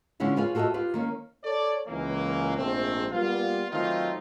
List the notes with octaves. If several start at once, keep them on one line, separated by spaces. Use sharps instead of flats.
D3 G#3 B3 C#4 E4 F4
F4 G#4 B4 C#5 F5
F4 F#4 A4 A#4 D#5 E5
F4 G4 B4
D#3 A#3 C#4
A4 C#5 D5
C#2 E3 A#3
A#1 G#2 A3 C4
G3 A#3 B3 F4
D#3 F#3 A3 C4 D#4 F4